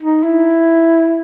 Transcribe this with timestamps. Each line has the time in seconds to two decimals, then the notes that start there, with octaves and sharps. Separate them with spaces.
0.02 D#4
0.23 E4